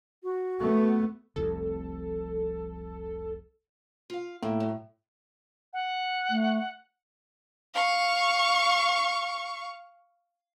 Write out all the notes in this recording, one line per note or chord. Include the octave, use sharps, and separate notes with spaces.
F#4
A3 B3
F1 C2 F2 A4
F4 F5
A2 A#3 E4
F#3
F#5
A3
F5 C#6